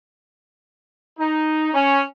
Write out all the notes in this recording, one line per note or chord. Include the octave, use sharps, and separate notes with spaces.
D#4
C#4